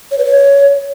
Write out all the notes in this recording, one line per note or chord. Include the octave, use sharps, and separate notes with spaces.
C#5
B4
C#5